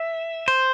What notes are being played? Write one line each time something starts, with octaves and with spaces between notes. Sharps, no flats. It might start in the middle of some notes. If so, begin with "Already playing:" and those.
Already playing: E5
C5